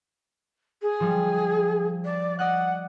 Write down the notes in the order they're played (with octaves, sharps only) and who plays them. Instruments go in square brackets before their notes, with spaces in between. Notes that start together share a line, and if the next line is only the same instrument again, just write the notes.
[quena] G#4
[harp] F3 G3
[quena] D5
[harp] D5 D#5 F#6 [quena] F#5